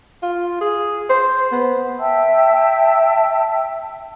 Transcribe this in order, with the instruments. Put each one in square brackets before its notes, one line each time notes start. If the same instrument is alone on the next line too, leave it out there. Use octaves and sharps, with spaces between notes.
[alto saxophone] F4
G#4
C5
B3
[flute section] E5 G5 A5 E6